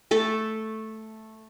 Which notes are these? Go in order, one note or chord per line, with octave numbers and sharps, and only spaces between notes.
A3 A4 A5